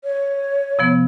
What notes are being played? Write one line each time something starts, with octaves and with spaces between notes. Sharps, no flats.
C#5
C3 F3 B3